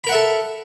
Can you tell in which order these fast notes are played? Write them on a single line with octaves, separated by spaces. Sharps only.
B5 A#4 F#5 E5 A4